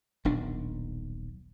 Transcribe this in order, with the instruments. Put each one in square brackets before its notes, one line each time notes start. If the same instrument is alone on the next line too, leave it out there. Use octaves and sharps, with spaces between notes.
[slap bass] D#1 B1 D4